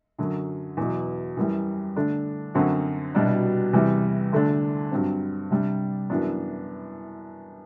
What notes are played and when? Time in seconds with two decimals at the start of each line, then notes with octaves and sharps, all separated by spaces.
0.19 F#2 D3 F#3
0.77 E2 B2 F#3
1.37 F#2 E3 G3
1.96 D3 A3 D4
2.54 F#2 D3 F#3 C4 F#4
3.15 C2 B2 G3 D4
3.73 E2 C3 E3 G3
4.32 D2 D3 A3 D4
4.91 G2 F#3 C4
5.51 C3 G3 D4
6.10 F#2 E3 B3 D4